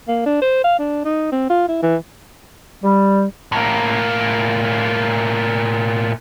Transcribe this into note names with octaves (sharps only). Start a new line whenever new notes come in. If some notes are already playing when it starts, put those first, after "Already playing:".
A#3
D4
C5
F5
D4
D#4
C4
F4
E4
E3
G3
A2 A#3